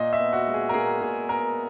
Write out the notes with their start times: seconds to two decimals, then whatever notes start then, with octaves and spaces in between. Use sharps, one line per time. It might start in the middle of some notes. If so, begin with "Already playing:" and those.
Already playing: A#2 D#5
0.13 E5
0.19 B3
0.33 F#4
0.47 G#3
0.54 G#4
0.69 A#4
0.74 A#2 G#4
1.01 A#2 G#4
1.29 B3 A#4